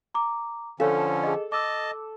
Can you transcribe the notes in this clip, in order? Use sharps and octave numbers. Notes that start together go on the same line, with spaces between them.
A#5 D6
D3 F3 C#4 A4 C#5 F5
G#4 D#5
D#5 A5 D6 E6